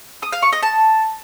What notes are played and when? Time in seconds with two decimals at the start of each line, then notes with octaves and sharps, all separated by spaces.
0.22 D#6
0.32 F5
0.43 C#6
0.53 D#5
0.63 A5